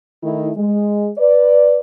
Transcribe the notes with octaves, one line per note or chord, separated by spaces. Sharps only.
D#3 A3 D#4 E4
G#3
B4 D5